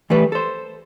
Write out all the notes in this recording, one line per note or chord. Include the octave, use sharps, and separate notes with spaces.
E3 G3 A3 B4
A4 C5